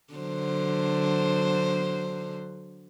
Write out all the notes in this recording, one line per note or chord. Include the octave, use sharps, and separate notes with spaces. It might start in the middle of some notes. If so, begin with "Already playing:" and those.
D3 F#3 C5